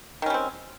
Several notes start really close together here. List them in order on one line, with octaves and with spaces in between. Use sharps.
D#3 C#4 G3 C4